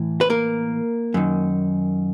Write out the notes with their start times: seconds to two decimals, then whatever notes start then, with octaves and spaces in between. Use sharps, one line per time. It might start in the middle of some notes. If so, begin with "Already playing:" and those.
Already playing: A2 E3
0.21 B4
0.30 A#3 A#4
1.14 F#2 D#3